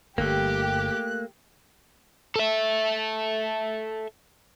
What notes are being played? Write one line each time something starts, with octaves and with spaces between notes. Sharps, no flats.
G1 G2 A3 A#3 G4 F#6
A4 E5